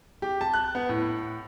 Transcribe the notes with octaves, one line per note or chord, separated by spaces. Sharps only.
G4
A5
F#6
B3
A2